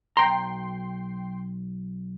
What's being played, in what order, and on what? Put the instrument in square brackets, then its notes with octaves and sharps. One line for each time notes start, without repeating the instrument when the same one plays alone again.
[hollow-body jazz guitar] B1 A#5 [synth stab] G5 C6